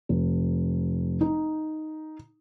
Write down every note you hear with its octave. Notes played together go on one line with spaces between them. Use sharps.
F1
D#4